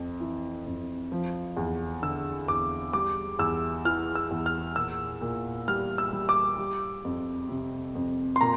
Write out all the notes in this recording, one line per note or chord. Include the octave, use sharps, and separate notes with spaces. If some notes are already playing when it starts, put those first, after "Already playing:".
Already playing: F2
E3
F2
F3
E2
D3 E6
E2 D6
G3 D6
E2 E6
E3 F6
E6
E2
F6
A#2 E6
A#2
G3 F6
E6
G3
D6
G3
F2
C3
F2
C6
A#2 A#5